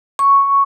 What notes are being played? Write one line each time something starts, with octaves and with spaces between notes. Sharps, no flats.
C#6